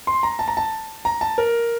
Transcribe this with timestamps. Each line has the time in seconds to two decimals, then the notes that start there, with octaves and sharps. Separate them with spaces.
0.07 C6
0.23 A#5
0.39 A5
0.48 A#5
0.57 A5
1.05 A#5
1.21 A5
1.38 A#4